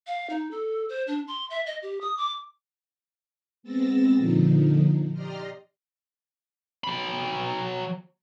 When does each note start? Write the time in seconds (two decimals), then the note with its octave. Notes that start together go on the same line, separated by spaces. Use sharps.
0.07 F5
0.30 D#4
0.51 A4
0.89 C5
1.07 D4
1.28 C6
1.50 E5
1.66 D#5
1.82 G4
2.01 D#6
2.17 D6
3.63 G#3 B3 C4 E6 A6 A#6
4.17 A#2 D3 F3 D#4
5.13 G4 D5 D#5 A#5 C6 F6
6.84 F#3 B5